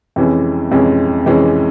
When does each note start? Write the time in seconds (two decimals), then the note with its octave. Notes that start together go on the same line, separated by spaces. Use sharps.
0.16 F2 C3 E3 G#3 C#4
0.71 F2 C3 E3 G#3 C#4
1.26 F2 C3 E3 G#3 C#4